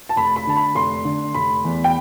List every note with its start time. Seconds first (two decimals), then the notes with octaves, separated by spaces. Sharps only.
0.09 A5
0.16 F1 B5
0.36 B5
0.47 D3 A5
0.56 B5
0.75 F1 C6
1.05 D3
1.34 F1 B5
1.64 E2
1.84 G5